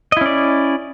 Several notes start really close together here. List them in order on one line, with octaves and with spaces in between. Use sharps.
D#5 E4 C#4 D5